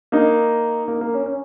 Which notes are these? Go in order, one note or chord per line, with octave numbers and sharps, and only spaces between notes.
A#3 D#4
A#3
A#3
C#4
C#4